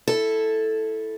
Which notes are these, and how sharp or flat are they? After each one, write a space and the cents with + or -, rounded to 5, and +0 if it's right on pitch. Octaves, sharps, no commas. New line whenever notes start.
E4 -5 A4 +0